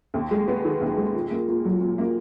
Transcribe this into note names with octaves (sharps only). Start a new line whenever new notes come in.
D#2
G#3
B3
D#3
D#2
G#3
A#2
A#3
A#2
F#3
A#2
A#3